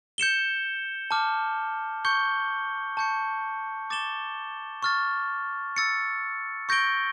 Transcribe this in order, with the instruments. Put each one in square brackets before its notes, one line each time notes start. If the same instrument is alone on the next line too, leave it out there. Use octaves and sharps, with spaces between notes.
[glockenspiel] G6 C#7 E7 G7
A5 D6 F6
C#6 G6 C#7 G7
A5 C#6 G6 C#7
D6 A6 E7 G7
C#6 F6 A6
E6 A6 C#7
C#6 G6 A#6 D7 G7